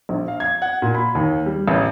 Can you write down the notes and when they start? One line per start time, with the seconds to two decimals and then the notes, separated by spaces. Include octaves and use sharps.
0.09 A#1
0.28 F5
0.40 G#6
0.62 F#5
0.82 A#2
0.95 B5
1.15 D#2
1.46 G3
1.68 A1